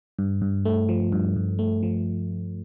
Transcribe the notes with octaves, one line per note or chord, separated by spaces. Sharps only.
G2
G2
A3
F3
G2
G2
A3
F3